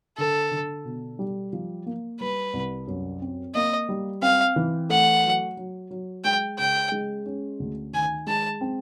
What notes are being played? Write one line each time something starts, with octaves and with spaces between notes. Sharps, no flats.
D3 A4
D3
B2
G3
F3
A#3
G3 B4
C2
F#2
C4
A#3 D#5
G3
C4 F5
E3
A3 F#5
F#3
F#3
F#3
G#3 G5
C#3 G5
G#3
C#4
D2
D#3 G#5
G#3 A5
C4